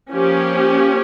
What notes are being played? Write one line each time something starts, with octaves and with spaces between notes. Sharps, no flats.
F3 A#3 C#4 G4